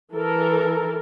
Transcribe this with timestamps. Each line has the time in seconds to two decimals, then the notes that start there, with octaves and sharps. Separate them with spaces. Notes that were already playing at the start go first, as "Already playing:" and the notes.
0.13 E3 A4 A#4